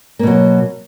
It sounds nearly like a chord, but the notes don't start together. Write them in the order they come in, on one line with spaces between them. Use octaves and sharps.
A#3 B2 F#3